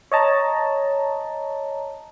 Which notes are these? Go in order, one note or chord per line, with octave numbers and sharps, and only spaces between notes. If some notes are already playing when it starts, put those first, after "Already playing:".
C#5 D#5 A5 A#5